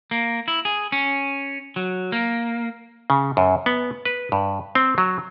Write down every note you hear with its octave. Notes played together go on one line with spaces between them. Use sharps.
A#3
E4
G#4
C#4
F#3
A#3
C#3
F#2
B3
B4
G2
C4
F#3